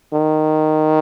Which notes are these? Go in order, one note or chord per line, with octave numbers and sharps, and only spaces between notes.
D#3